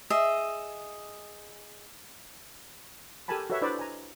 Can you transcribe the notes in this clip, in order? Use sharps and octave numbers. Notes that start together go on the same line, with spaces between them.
G#4 D#5 E5
G4 A4 A#4 G#5 A5 B5
F#4 A4 B4 C#5 E5 F#5
D4 E4 B4 C5 D5 E6
G#5 A#5